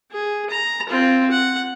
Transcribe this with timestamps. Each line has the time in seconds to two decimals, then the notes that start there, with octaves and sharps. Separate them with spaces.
0.11 G#4
0.50 A#5
0.89 C4 F4
1.31 F#5